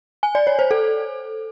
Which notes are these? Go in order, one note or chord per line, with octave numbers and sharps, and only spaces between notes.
G#5
D5
C#5
C5
A4